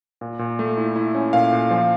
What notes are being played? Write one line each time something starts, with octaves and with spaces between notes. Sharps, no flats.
A#2
A#2
A3
E4
E4
C#4
A#2 F5
A#2
F3